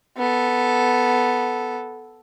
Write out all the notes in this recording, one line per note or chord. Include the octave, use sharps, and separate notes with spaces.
B3 A4